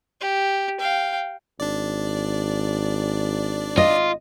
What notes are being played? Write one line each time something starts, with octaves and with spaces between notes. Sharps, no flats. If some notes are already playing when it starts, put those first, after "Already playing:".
G4
F5 G5
G#1 D4 D5
F4 D#5